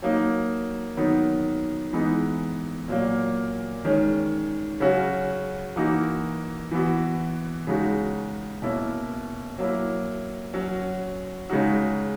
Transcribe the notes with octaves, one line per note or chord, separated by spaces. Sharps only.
F#3 A#3 D#4
D#3 F#3 B3 D#4
E3 G#3 B3 D#4
A#2 F#3 A#3
D#3 G#3 C#4
C#3 F#3 C#4 F#4
E3 A#3 D#4 F#4
E3 B3 F#4
C#3 G#3 D#4 F#4
B2 A#3 C#4 E4
F#3 A#3 E4
F#3 C#4 F#4
C#3 G#3 D#4 F#4